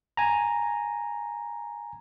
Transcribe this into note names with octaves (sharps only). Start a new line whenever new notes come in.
G#5 A#5